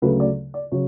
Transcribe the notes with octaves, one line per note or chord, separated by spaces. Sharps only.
D2 C#3 F#3 A3 B4
D5
D5
C#3 F#3 C#5